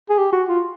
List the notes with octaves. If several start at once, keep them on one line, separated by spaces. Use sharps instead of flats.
G#4
G4
F#4
F4